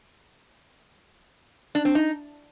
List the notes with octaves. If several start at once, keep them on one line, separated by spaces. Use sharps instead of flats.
D4
C4
D#4